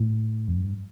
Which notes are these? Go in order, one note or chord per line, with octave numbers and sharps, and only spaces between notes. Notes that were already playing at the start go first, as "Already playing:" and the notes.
Already playing: A2
F2
F#2
G2